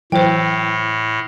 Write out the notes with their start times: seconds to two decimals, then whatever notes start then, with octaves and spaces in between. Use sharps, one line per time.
0.12 A2 E3 F#3 C5 G5